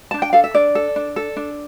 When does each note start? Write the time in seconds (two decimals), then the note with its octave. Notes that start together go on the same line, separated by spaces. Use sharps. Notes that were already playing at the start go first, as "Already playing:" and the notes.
0.11 D4 A5
0.22 G5
0.33 A4 F5
0.44 E5
0.54 D4 D5
0.75 A4
0.96 D4
1.16 A4
1.36 D4